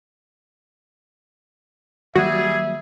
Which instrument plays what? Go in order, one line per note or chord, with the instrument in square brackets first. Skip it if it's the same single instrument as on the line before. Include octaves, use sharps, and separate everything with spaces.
[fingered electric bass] D#3 F#3 A#3 [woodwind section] G3 G#4 [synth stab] F#4 [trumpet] E5